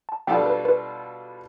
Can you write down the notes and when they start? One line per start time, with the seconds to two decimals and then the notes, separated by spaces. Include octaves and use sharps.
0.09 A5
0.27 B2 G3 D4 F4 A4 G5
0.46 B4
0.65 B4